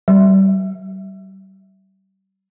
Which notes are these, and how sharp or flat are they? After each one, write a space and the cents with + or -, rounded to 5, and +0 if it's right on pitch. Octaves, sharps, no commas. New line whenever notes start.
G3 -35